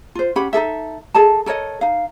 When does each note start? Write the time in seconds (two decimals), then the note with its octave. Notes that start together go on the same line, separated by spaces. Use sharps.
0.15 F4 C5
0.36 C#4 G4 F#5 B5
0.53 D#4 G#4 A4 E5
1.14 G#4 A4 D#5 A5
1.46 A4 A#4 C#5 D#5
1.81 D#4 F5